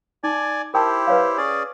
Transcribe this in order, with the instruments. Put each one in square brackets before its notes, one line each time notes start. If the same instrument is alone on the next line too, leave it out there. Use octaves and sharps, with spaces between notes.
[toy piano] D#4 [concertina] D5 G#5
[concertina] E4 G4 C5 [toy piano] A#4 G5 A5
[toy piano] B4 C#5 F5
[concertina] C#4 G#4 D5